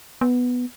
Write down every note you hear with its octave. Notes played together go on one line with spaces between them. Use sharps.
B3